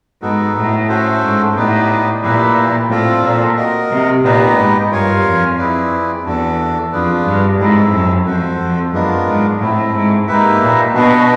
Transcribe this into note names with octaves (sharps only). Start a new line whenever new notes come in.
G#2 B3 D#4 F#4 A4
A2
A3 C#4 F#4 A4 C5
G#2
A2 B3 D#4 G4 B4 D5
A#2 E4 G4 B4 D5
A2 C4 F4 A4 D5
A#2
F#4 A#4 D#5
C3
A#2 B3 D#4 G4 B4 D#5
G#2
G2 F4 A#4 C#5 F5 G#5
F2
C4 E4 G#4 B4 D5
E2 D4 F#4 A4
F2 D4 F4 G#4 B4 D5
G2
G#2 C4 E4 A4
F#2
F2 F#4 A4 C5
F2
F#2 G#3 B3 D4 F4 A#4
G#2
A2 A3 C4 E4
G#2
G#2 A#3 D#4 G4 B4 E5
A#2
B2 D4 F#4 B4 D#5